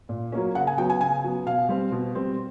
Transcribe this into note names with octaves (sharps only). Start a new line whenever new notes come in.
A#2
F#3 A#3 C#4
C#3 F#5
G#5
F#3 B3 G5
G#5
C#3 G#5
F#3 B3
B2 F5
G3 C4
B2
G3 C4